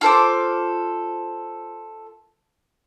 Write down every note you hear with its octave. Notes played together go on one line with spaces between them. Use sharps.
F4 A4 C5 D6